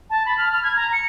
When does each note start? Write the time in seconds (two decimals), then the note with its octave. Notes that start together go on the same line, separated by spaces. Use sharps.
0.10 A5
0.26 B5
0.38 F6
0.52 F6
0.63 G#6
0.76 A#5
0.93 C#7